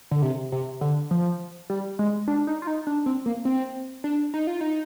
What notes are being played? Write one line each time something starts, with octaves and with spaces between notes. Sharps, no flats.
D3
C3
C3
D3
F3
G3
G#3
D4
D#4
F4
D#4
D4
C4
A#3
C4
D4
D#4
F4
D#4